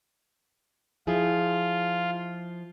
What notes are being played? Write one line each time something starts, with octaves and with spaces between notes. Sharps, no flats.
F3 E4 F4 G#4